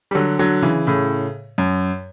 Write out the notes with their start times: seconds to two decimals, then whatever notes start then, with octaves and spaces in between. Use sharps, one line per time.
0.11 G3
0.15 D3 F#3
0.39 D3 F#3
0.62 C#3 E3
0.87 A2 C#3
1.58 F#2